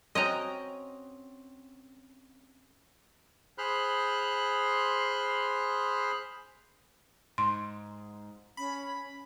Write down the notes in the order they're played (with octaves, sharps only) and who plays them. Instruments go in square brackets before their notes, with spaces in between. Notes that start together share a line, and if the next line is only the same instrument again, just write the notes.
[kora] C4 C#4 F#4 [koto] D#5 G5 A#5
[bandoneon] G#4 C5 B5 C6 F6 F#6
[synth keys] G#2 [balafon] C6
[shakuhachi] C#4 [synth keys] B5